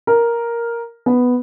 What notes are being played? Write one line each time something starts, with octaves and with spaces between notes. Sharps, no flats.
A#4
B3